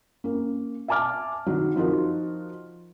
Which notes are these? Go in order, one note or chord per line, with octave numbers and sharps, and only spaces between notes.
A#3 C#4
E5 G#5 A5 D6 F6
D#3 F#3
F3 D#4 F4 F#4 A#4